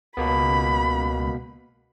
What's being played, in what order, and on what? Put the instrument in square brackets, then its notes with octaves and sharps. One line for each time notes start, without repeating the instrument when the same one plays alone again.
[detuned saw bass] C#2 [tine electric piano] B2 A#3 B3 [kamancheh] B5